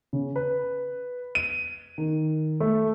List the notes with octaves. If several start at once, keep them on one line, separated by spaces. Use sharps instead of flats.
C#3
B4
D#7
D#3
A3